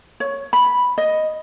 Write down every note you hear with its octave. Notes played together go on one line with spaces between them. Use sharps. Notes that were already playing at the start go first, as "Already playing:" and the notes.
C#5
B5
D#5